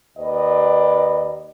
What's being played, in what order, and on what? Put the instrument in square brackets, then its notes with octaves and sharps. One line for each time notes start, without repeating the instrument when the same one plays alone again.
[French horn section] D#2 B4 D5 D#5